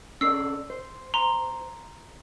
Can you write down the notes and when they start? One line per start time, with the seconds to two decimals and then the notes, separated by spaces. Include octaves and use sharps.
0.21 C#4 A4 D5 E6 C7
0.70 C5
1.14 A#5 C6